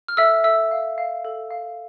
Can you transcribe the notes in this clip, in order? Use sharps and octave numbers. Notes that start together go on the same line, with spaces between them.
F6
A4 E5 E6
A4 E5 E6
F5
F5
A4
F5